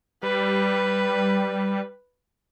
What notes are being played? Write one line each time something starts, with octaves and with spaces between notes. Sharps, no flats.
G3 B4